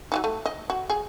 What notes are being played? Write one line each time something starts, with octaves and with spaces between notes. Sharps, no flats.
F#3 G3 D#4
A3
D#5
F#4
G#4